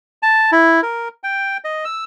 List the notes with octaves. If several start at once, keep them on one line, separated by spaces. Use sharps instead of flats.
A5
E4
A#4
G5
D#5
E6